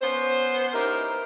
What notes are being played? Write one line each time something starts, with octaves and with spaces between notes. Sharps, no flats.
B3 C#4 C5
D#4 E4 G4 A#4